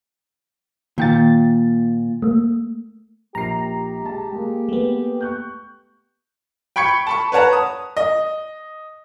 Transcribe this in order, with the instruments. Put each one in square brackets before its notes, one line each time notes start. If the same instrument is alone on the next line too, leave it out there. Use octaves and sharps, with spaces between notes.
[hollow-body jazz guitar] A#2 [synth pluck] D#3 G5 A6
[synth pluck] A3 A#3
[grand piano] A#1 C7 [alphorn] G4 [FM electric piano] A#5
[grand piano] G#3 A5
G#3 A#3
[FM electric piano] A3 B3
[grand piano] C#6 F#6 G6
G5 B5 C#6 G#6 C#7
A5 B5 C#6
B4 C#5 F#5 A5 A#5
D#6
D#5